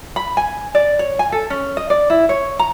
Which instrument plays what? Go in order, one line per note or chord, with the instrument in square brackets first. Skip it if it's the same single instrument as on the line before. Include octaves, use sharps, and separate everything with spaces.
[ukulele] B5
G#5
D5
C#5
G#5
A4
C#4
D#5
D5
E4
C#5
A#5